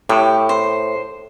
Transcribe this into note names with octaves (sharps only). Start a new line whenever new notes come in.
A2 G4
C5